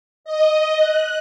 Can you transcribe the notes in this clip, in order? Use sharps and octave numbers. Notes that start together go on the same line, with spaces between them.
D#5
F#6